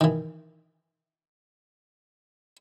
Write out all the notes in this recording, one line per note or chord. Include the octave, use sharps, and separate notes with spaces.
D#3 E3